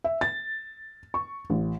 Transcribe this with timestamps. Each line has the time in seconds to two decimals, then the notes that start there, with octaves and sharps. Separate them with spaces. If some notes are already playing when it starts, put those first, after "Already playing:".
0.04 E5
0.21 A6
1.14 C#6
1.50 A1